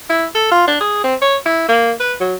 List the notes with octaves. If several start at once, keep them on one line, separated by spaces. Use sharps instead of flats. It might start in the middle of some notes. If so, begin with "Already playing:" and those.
E4
A4
F4
D4
G#4
C4
C#5
E4
A#3
B4
F#3